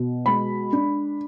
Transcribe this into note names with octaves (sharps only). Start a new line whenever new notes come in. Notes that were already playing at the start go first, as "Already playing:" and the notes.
Already playing: B2
G#3 B5
D4